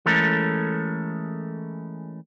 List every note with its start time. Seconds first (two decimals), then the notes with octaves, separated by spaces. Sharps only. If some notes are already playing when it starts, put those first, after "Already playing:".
0.06 E3 G#3 A3 C#4 A4 A#4